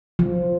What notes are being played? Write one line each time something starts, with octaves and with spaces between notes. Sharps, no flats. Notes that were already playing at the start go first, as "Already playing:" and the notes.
F3